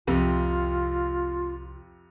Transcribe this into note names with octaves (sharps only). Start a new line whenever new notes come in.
C2 F2 C3 F4